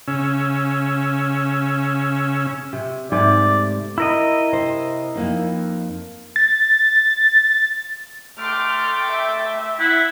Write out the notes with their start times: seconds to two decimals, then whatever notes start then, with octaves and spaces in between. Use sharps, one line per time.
0.07 C#3 C#4 E6
2.73 C3
3.12 G#2 C3 A3 D5
3.98 E4 A#4 D#5
4.52 C3 C5
5.15 F2 A#3 D#4
6.36 A6
8.39 A3 G5 C6 D6 F6
9.11 E5
9.80 E4 F#5